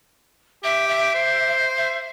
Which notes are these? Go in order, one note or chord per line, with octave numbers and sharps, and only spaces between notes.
G4 E5
E5
C5
E5